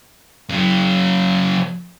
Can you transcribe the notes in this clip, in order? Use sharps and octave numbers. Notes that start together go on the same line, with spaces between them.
C#3 F#3